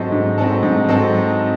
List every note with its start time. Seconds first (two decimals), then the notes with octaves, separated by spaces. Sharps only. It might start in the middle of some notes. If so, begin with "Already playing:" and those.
Already playing: G#2 F#3 C4 D#4 A4
0.12 G#2
0.38 F#3 C4 D#4 A4
0.63 G#2
0.88 F#3 C4 D#4 A4